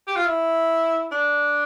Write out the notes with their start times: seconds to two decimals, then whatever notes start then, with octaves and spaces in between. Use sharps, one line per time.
0.07 G4
0.16 F4
0.26 E4
1.12 D4